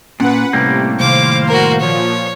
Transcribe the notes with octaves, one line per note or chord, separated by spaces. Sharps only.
A#2 C#4 B4 F#5
A2 C3 G3 A#3
C3 D#3 C5 F5 D6
F#4 A#4
A#2 F3 C#5